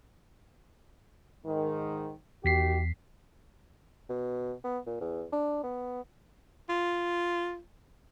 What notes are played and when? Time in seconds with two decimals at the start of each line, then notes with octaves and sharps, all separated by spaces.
1.46 G#2 D#3
2.45 E2 D#3 F#4 G4 B6 C7
4.09 B2
4.64 B3
4.87 A#2
5.01 E2
5.32 D4
5.63 B3
6.69 F4